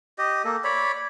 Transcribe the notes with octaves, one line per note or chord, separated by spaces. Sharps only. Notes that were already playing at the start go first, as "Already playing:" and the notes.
G4 D#5
A#3 A4
C#5 D5 B5